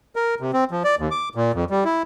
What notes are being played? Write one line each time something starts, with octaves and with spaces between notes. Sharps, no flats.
A#4
C3
C4
F3
D5
D#2
D6
A#2
F2
G3
E4